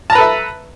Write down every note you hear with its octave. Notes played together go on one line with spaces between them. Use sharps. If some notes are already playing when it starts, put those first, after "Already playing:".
A4 B4 E5 A5 A#5